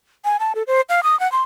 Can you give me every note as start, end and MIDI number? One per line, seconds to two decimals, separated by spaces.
0.25 0.37 80
0.40 0.53 81
0.55 0.63 69
0.67 0.81 72
0.89 1.01 77
1.04 1.18 87
1.20 1.30 78
1.32 1.42 84